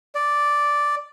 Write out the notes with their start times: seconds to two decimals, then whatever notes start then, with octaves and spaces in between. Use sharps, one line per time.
0.15 D5